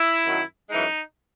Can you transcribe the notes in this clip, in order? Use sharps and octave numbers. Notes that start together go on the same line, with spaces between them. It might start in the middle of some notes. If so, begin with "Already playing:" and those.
Already playing: E4
F#2 D#3 F#3
F#2 E3 G#3 D#4